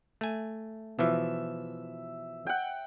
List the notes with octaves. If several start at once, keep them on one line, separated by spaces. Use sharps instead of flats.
A3 G#5
B2 E3 F3 E5
F#5 G5